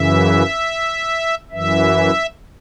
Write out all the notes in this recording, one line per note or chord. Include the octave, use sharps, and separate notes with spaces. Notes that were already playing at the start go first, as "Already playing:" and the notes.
Already playing: F#2 C#3 E3 E5
F#2 E3 E5